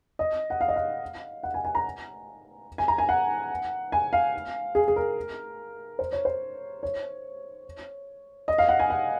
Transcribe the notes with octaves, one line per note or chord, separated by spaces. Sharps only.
D#5
F#5
F5
D#5
F5
F#5
G#5
G#5
A#5
G#5
A#5
G#5
F#5
G#5
F5
G#4
G#4
A#4
C5
C#5
C5
C#5
D#5
F5
F#5
G#5
F#5